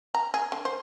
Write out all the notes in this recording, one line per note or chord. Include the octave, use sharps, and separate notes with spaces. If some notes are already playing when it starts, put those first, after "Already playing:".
A#5
G#4
D3
C5